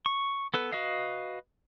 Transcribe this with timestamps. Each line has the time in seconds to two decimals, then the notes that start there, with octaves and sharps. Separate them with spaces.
0.06 C#6
0.54 B3 A4 B4
0.72 F#4 B4 D#5 F5